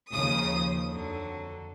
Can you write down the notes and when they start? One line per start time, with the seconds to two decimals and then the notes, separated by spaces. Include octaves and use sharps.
0.11 D#2 C#3 F3 D#6
0.89 F2 D3 F#3